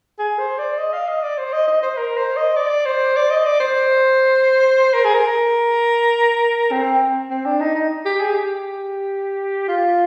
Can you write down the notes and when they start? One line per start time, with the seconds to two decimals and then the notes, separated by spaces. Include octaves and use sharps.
0.19 G#4
0.39 C5
0.59 D5
0.78 D#5
0.93 F5
1.08 D#5
1.23 D5
1.38 C5
1.53 D#5
1.67 D#5
1.83 C5
1.97 A#4
2.17 C5
2.37 D#5
2.56 D5
2.86 C5
3.16 D5
3.31 D#5
3.46 D5
3.60 C5
4.94 A#4
5.04 G#4
5.14 A#4
6.72 C4
7.30 C4
7.45 D4
7.61 D#4
7.75 D#4
8.05 G4
8.20 G#4
8.35 G4
9.68 F4